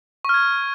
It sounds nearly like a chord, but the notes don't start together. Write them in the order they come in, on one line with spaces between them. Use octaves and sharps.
C#6 F6 G#6